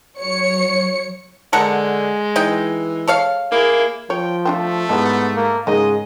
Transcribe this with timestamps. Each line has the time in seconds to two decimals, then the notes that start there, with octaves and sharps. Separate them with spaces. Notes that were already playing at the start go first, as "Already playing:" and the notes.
0.18 F#3 C#5 C#7
1.53 D3 G#3 A4 A#4 F#5
2.36 E3 D#4 D#5 G5
3.08 A4 C#5 F5
3.51 A#3 E4 G#4
4.10 F3 C#5 G5
4.45 A3 C4 D4 F4
4.89 G#2 G3 B3 E4 A4
5.36 A#3
5.67 G#2 C#3 G#3 A#3 D#4 D#5